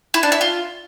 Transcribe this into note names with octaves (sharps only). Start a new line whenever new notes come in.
E4
D4
E4
F4